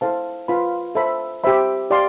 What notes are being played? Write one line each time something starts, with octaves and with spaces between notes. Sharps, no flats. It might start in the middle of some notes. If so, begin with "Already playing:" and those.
E4 A4 C5 F5 A5
F4 B4 F5 B5
A4 C5 E5 B5
G4 C5 E5 B5
G4 D5 F5 C6